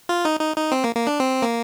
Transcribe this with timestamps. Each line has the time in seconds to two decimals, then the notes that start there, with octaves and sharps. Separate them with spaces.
0.09 F4
0.25 D#4
0.40 D#4
0.56 D#4
0.72 C4
0.84 A#3
0.95 A#3
1.07 D4
1.20 C4
1.42 A#3